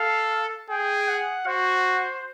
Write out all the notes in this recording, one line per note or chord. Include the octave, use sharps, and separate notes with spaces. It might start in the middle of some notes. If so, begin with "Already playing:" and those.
Already playing: A4 F5
G#4 G5
F#5
F#4 C5